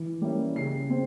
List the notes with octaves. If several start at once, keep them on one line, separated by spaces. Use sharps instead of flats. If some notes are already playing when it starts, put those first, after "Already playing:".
Already playing: E3
G3 A#3 C#4 E4
C#3 C7
C4